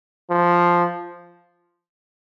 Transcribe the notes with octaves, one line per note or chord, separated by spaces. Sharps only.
F3